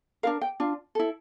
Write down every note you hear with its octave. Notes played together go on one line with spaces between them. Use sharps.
D4 F4 A#4 F5
G5
D4 F4
E4 A4